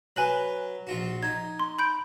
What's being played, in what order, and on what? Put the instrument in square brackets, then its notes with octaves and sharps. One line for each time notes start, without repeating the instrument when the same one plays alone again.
[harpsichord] F#3 B4 [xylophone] G#5 F#6 F#7
[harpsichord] A#1 F4 F#4
[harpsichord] D#4 [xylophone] G#6
[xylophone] C6
B5 G6 D7